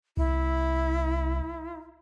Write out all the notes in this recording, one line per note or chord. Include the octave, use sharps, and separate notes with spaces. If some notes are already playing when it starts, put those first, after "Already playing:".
C2 E4